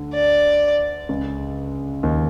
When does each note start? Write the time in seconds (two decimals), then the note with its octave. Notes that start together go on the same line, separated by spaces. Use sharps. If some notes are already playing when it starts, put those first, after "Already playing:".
Already playing: D2 D3
0.14 D5
1.09 C#2 C#3
2.03 D#2 D#3